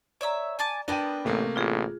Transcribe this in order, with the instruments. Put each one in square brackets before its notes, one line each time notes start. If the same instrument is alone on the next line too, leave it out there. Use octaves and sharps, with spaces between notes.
[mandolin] C#5 E5 E6 [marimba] D5 A#5
[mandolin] G#5 A5 D6
[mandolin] B3 A#4 B4 [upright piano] D4 G5 D#7 [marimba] A5
[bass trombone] A1 [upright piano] C3 A3 A#3
[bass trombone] A1 [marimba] F4 G#4